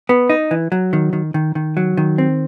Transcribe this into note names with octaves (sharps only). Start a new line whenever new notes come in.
B3
D#4
E3
F#3
D#3
D#3
D#3
D#3
F#3
D#3
C4